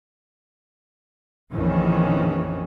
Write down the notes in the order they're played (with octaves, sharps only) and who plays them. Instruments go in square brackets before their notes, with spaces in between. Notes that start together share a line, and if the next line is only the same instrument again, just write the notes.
[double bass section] A#1 F2 D#3 E3 C#4